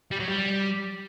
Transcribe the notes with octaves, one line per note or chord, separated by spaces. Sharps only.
G3
F#3
G3